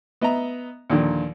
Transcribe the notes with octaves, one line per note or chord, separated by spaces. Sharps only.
B3 D#5 E5 A#5
D#2 A#2 D3 F3